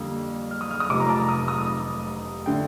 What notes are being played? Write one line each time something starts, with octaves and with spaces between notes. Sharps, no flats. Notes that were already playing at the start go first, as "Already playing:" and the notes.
Already playing: F2 D3 G3 A#3
F6
D#6
F6
D#6
F1 F2 C3 D6
A#5
A5
A#5
D#6
D#6
D3 A3 G5